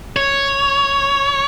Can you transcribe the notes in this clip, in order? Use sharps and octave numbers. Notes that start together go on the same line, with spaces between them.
C#5